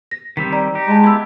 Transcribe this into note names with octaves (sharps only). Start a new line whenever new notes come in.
A#6
D#3 G3 C4 B6
D5 A#5
D#4 G4
G#3 A5 A#5
B3 E4 G4 B5 E6